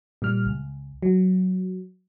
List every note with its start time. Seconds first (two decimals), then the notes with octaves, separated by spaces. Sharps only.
0.22 A#2 G3 F6
0.45 C#2
1.02 F#3